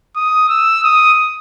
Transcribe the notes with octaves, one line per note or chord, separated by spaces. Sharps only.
D#6
E6
D#6